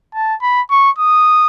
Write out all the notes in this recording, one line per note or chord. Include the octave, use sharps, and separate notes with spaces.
A5
B5
C#6
D#6